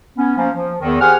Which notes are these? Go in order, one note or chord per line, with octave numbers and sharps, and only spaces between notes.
B3 C#4
F3 A#3 C#4
F3
E2 D#3
G4 G#4 C5 F#5 G#5 F6